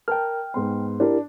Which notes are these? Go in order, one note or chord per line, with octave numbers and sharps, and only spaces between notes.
A#4 G5 A5 F6
G#2 B3 C6
D4 E4 G4 A#4